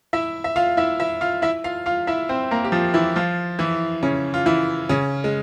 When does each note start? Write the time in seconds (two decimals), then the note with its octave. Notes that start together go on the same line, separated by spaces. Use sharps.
0.13 E4 E5
0.44 E5
0.56 F4 F5
0.77 E4 E5
1.00 E4 E5
1.21 F4 F5
1.42 E4 E5
1.64 F4 F5
1.86 F4 F5
2.07 E4 E5
2.29 C4 C5
2.51 A#3 A#4
2.65 G4
2.72 F3 F4
2.94 E3 E4
3.16 F3 F4
3.59 E3 E4
4.03 C#3 C#4
4.34 F4
4.46 E3 E4
4.89 C#3 C#4
5.24 G#3